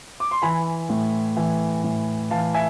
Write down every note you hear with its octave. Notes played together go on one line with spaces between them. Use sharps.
D6
C6
E3 G#5 B5
A2
E3
A2
E3 F5 A5
E5 G#5